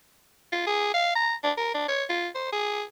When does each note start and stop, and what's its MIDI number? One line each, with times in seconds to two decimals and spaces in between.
0.52 0.65 65
0.67 0.91 68
0.94 1.13 77
1.15 1.35 82
1.44 1.52 62
1.57 1.73 70
1.74 1.86 62
1.88 2.04 73
2.10 2.28 65
2.35 2.50 72
2.52 2.83 68